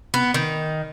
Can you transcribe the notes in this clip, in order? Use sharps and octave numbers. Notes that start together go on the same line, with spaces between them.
B3
D#3